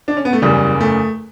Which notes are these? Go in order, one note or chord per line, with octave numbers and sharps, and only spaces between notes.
D4
C#4
B3
A3
F#1 E2 C#3 G3
A3